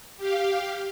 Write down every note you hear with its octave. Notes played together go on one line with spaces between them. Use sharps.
G4 F5